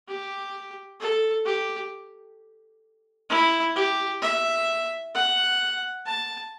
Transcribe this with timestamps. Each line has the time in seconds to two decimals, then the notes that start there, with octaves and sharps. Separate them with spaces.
0.08 G4
1.00 A4
1.45 G4
3.30 E4
3.76 G4
4.22 E5
5.14 F#5
6.06 A5